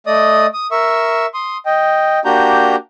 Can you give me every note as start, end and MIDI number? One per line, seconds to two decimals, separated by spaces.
0.07 0.46 57
0.07 0.46 74
0.07 0.46 75
0.07 0.46 87
0.54 0.67 87
0.72 1.26 70
0.72 1.26 76
0.72 1.26 85
0.72 1.26 88
1.34 1.57 84
1.34 1.57 87
1.66 2.19 75
1.66 2.19 79
2.25 2.76 58
2.25 2.76 62
2.25 2.76 66
2.25 2.76 67
2.25 2.76 82
2.25 2.76 91